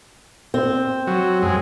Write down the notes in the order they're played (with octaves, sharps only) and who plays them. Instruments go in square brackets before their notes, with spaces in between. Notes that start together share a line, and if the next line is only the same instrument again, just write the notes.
[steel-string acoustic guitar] C4
[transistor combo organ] F#3
F#2 G#3